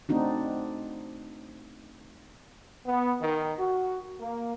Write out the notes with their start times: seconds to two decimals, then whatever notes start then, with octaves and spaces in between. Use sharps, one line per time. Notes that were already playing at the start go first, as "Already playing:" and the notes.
0.09 A3 C4 D4 D#4 F#4
2.86 B3
3.21 D#3
3.59 F#4
4.20 A#3